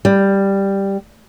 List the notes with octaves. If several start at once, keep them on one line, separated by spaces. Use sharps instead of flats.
G3